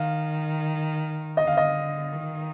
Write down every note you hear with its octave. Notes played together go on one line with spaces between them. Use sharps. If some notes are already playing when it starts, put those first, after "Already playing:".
Already playing: D#3 F5
D3 D#5
F5
D#5
D#3